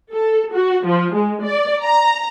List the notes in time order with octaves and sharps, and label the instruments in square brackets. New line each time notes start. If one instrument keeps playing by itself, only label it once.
[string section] A4
F#4
F3
G#3
D5
A#5